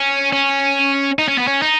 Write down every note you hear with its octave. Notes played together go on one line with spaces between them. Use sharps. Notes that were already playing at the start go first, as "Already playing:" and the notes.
Already playing: C#4
C#4
D#4
C#4
B3
C#4
D#4